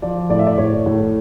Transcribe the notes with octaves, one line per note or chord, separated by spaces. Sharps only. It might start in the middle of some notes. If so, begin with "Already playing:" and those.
F3 D5
A2 D5
E5
D5
A2 C#5
A2